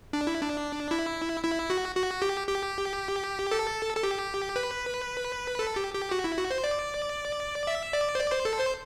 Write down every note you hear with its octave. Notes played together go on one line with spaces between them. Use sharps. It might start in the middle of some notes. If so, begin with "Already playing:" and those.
D4
E4
D4
E4
E4
F#4
F#4
G4
G4
A4
A4
G4
B4
A4
G4
G4
F#4
E4
F#4
C5
D5
E5
D5
C5
D5
C5
A4
C5